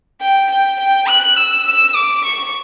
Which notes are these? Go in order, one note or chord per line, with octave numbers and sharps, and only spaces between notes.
G5
G5
G5
F#6
E6
E6
D6
C#6